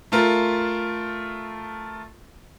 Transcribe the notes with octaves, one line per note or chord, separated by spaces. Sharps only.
A3 F4 A#4